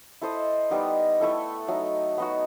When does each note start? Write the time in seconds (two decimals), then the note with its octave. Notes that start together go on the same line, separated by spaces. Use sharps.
0.22 E4 A4 C5 D#5
0.70 G3 B3 D#4
1.20 A3 E4 A4 E5
1.68 F#3 A3 D#4
2.18 B3 D#4 F#4